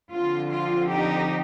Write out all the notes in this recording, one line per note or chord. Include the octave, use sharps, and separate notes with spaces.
D3 F3 C4 F4
F4
D#4 G4